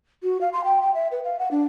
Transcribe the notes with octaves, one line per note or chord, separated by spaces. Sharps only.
F#4
F5
C6
G5
G5
E5
B4
F5
F#5
D4